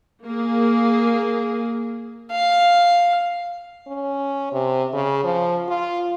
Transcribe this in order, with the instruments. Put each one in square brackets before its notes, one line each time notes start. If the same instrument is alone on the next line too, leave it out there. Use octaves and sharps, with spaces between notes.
[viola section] A#3 G#4
[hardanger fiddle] F5
[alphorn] C#4
C3
C#3
F3
F4